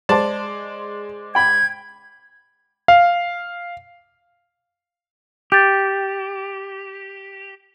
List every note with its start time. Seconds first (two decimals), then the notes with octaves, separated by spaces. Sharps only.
0.09 G#3 C5 D5 A5
1.35 G5 B5 G#6
2.88 F5
5.52 G4 G6 A6